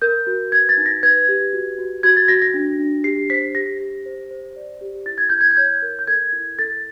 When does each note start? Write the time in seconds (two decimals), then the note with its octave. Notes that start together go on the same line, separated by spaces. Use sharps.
0.02 A#4 G6
0.27 F#4
0.52 B4 G#6
0.69 A6
0.78 D#4
0.86 A#6
1.03 B4 G#6
1.28 G4
1.53 F#4
1.79 F#4
2.03 F#4 G#6
2.16 A6
2.28 F#4 A#6
2.42 A#6
2.54 D4
2.79 D4
3.04 G4 C7
3.30 C5 B6
3.55 G4 A#6
3.80 G4
4.06 C5
4.31 C5
4.56 D5
4.81 G4
5.06 E4 A6
5.18 G#6
5.29 E4 G6
5.41 G#6
5.51 G#6
5.57 C#5 G6
5.82 A#4
5.99 G6
6.07 A4 G#6
6.33 E4
6.59 A4 A6